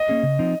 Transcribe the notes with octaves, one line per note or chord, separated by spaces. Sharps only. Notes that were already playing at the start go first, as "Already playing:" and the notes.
Already playing: D#5
A#3 C#4 G#4
C#3
F3 C4 D#4